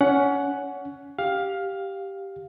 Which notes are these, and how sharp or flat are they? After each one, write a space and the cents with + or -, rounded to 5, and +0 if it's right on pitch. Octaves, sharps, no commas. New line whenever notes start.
C#4 +25 F#5 +0
G4 +0 F5 +10